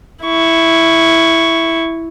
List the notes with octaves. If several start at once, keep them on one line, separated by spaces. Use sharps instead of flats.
E4 C#6